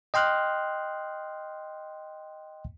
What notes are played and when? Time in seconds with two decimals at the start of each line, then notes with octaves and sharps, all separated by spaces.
0.14 D#5 G5 C6 F6 F#6